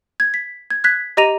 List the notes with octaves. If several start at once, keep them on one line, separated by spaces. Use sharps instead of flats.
G#6
B6
G#6
F#6 G#6 B6
G4 D#5 A#5 A#6 D#7 F7